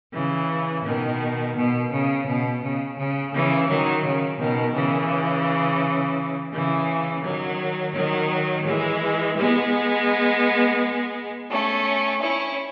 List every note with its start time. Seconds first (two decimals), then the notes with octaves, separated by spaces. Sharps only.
0.13 C#3 E3
0.84 B2 D#3
1.55 B2
1.91 C#3
2.26 B2
2.62 C#3
2.97 C#3
3.33 C#3 E3
3.69 D#3 F#3
4.03 C#3
4.39 B2 D#3
4.74 C#3 E3
6.53 C#3 E3
7.24 D#3 F#3
7.94 D#3 F#3
8.65 E3 G#3
9.37 G#3 B3
11.49 A3 C#4
12.20 C#4 E4